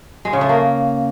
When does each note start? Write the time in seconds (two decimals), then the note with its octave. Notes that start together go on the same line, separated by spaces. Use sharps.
0.25 G#3
0.33 C#3
0.41 A3
0.49 A#3